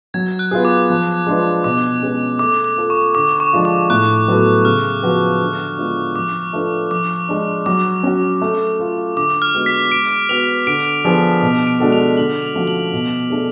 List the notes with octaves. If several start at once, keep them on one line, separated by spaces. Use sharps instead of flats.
F#3 G#6
F#6
B3 F4 G#4
D6
F3
G#3 D4 F4 B4
B2 D6
G#3 C#4 G#4 B4
A3 D6
D6
F4 A4
C#6
D3 D6
C#6
F3 G#3 D4 F4
D6
A2 F#6
F#3 B3 F#4 A4
C#3 F6
F3 B3 F#4 B4
D3
G#3 B3 D4 F4
F3 D6
A3 D4 F4 B4
F3 D6
G#3 D4
F#3 D6
C#4 F#4
A3
F4 A4
D3 D6
F6
G#3 B3 F#4
B6
G#3 D7
B3 F#4 B4 F7
D3 D7
F3 B3 D4 G#4
B2
D7
G#3 D4 F#4 A4
F7
D3 F#7
F7
F3 A3 C#4 F#4
F#7
B2
A3 D4 G#4